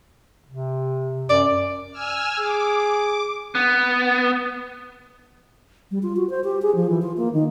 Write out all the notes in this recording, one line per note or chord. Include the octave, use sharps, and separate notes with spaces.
C3
F#2 D5
G#5 E6 F6
G#4 D6
B3
G3
F4
F#4
C5
G4
G#4
F3
E3
F4
A#3
D#3